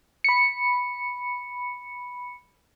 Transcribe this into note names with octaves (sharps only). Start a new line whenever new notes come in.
B5 C#7